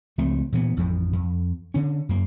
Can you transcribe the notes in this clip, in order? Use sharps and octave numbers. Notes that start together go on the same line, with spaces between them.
C#2 F3 A3 C4
A#2 E3 B3
A1 F2 F3
F2
D3 C#4
F#2 A#3